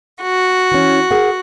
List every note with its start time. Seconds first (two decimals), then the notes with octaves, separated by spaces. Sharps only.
0.22 F#4
0.72 E3 C#4
1.11 G#4 A#4 F#5